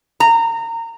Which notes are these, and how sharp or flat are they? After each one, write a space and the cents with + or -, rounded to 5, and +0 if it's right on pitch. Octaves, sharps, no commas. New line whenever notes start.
A#5 -25